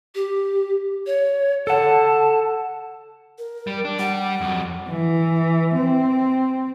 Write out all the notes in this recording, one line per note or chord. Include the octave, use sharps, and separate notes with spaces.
G4
C#5
A4 F#5 A5
A#4
G3
D4
G3 F#5
F2 F#3
E3
C4